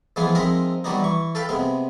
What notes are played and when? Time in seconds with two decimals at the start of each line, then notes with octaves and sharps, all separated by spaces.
0.16 E3 F3 G#3 B3 F4 G#4
0.35 F3 G#3 C4 D#4 A#4 E5
0.84 F#3 G3 B3 D4 D#4
1.00 E3 C#6
1.35 A4 B4 F5 G5
1.49 C3 G#3 B3